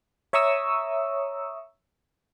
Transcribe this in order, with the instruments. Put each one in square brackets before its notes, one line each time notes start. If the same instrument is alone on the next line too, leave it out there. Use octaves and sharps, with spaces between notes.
[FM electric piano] C#5 E5 A#5 C#6 D#6 E6